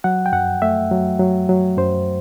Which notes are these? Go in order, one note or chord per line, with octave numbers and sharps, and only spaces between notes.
F#3 F#5
G5
F#2 F#5
A3 E5
F#3
F#3
F#3
F#2 C5